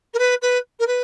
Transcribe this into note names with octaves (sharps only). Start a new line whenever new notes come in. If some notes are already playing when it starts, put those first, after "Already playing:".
A#4
B4
B4
A#4
B4